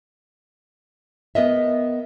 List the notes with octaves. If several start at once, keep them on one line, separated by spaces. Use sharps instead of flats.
B3 A#4 D#5 E5